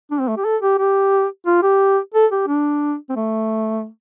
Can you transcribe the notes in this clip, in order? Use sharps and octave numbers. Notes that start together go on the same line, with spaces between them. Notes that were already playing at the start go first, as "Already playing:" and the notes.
D4
C4
A3
G4
A4
G4
G4
F4
G4
A4
G4
D4
C4
A3